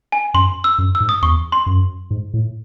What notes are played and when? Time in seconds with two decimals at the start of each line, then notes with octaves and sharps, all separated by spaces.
0.12 G#5
0.34 F#2 C6
0.64 E6
0.78 F#2
0.95 E6
1.00 G#2
1.09 D#6
1.22 E2 C#6
1.52 C6
1.66 F#2
2.11 G#2
2.34 A2